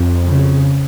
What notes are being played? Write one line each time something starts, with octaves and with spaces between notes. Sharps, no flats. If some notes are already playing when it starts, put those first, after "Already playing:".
Already playing: F2
C#3